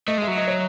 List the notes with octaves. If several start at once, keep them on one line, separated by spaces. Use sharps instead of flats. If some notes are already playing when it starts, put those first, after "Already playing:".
A3 D#5
G#3 E5
F#3
D#5
C#5